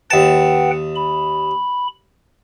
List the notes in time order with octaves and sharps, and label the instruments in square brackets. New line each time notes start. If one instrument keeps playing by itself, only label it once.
[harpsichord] D#2 A5 [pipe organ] B4 F#5 G5
[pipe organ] B5